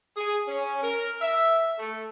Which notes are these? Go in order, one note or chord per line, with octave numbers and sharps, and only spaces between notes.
G#4
C#4
A#4
E5
A3